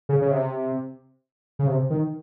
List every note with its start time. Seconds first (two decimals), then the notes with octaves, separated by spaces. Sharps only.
0.09 C#3
0.22 C#3
0.31 C3
1.59 C#3
1.67 C3
1.90 D#3